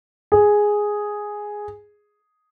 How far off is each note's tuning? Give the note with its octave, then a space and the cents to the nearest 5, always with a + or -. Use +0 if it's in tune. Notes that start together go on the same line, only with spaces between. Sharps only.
G#4 +0